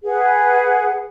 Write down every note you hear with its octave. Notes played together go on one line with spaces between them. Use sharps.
G#4 B4 F#5